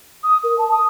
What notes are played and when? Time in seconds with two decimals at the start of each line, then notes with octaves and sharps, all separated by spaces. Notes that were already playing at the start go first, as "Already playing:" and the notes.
0.23 D#6
0.44 A#4
0.58 A5
0.72 D#6